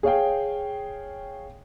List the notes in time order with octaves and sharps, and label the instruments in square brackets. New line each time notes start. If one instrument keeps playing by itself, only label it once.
[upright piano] G#4 C#5 F5 G5